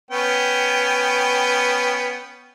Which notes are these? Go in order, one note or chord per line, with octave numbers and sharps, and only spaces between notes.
B3 C#4 G5